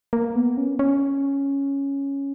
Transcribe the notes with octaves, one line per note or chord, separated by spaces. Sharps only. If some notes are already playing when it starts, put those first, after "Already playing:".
A#3
B3
C#4
C#4